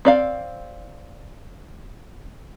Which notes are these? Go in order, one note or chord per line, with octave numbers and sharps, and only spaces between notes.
C4 D5 F5